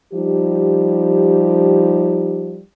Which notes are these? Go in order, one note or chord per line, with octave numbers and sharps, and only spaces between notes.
F3 G3 D#4 G4